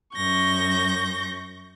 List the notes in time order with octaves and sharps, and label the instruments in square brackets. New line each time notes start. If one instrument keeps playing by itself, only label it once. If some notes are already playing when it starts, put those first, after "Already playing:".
[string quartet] F#2 C#6 G6 A#6